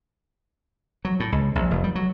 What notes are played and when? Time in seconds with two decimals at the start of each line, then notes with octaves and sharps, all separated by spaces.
1.05 F#3
1.20 A2
1.32 C#2
1.55 A#1
1.71 F1
1.84 G3
1.95 F#3